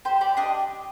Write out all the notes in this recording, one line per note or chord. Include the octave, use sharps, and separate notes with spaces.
G4 C5
G4 D5
D4 D#5